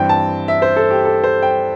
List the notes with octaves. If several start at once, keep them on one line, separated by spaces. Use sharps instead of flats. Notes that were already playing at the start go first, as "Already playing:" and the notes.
Already playing: G2 E3 C4 G5
A5
E5
C5
A4
G4
A4
C5
G5